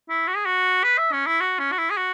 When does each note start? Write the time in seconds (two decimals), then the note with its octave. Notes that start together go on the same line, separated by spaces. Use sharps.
0.09 E4
0.28 F#4
0.36 G#4
0.46 F#4
0.84 B4
0.98 E5
1.13 C#4
1.27 E4
1.41 F#4
1.59 C#4
1.72 F#4
1.78 E4
1.91 G#4
1.97 F#4